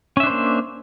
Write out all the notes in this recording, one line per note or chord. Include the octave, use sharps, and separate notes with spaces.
A#3 C#4 D4 C5 E5